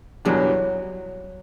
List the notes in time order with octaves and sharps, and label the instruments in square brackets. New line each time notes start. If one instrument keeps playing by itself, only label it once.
[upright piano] F#1 E2 B2 G3 D4 [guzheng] F#3